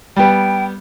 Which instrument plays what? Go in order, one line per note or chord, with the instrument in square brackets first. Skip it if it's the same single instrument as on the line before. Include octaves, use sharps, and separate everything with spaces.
[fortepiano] G3 B3 [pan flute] G5